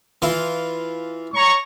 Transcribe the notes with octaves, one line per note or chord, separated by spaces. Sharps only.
E3 F4
C#5 A#5 C#6